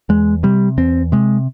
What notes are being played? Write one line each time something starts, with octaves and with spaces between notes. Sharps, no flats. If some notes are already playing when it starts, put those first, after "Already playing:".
E2 G#3
C3 G3
E2 C4
C3 G#3